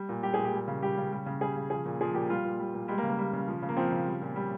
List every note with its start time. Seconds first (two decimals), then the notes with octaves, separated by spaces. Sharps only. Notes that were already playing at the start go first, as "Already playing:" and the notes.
Already playing: G3
0.09 A#2
0.23 G3 G4
0.34 A#2 G#4
0.45 G4
0.53 G3
0.68 C#3
0.82 G3 G4
0.97 C#3
1.12 G3
1.26 C#3
1.41 G3 G#4
1.57 C#3
1.70 F3 G#4
1.85 A#2
2.01 F3 G#4
2.14 A#2 G4
2.30 G3 F4
2.44 A#2
2.59 G3
2.74 A#2
2.88 G3 G#3
2.98 A#3
3.03 C#3
3.09 A#3
3.18 G3
3.33 C#3
3.48 F3
3.62 C#3
3.69 A#3
3.77 F3 C4
3.92 C#3
4.06 G3
4.22 A#2
4.36 G3